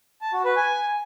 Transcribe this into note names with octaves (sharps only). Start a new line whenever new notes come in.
A5
F#4
B4
G#5